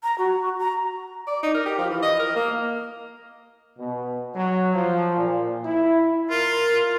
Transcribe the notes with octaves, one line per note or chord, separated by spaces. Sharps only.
A#5
F#4
A#5
D5
D#4
A#4
G4
F3
E3
D#5
A#4
A#3
B2
F#3
F3
A#2
E4
F4 A#4